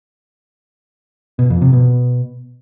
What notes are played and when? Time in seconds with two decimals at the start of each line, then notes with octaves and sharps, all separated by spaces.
1.39 B2
1.50 F2
1.62 C3
1.73 B2